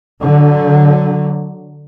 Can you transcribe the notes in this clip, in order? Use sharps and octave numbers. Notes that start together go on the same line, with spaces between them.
D3 F#3